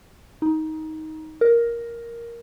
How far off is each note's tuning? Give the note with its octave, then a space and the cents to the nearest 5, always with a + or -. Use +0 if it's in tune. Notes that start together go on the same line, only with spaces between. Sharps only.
D#4 +15
A#4 +5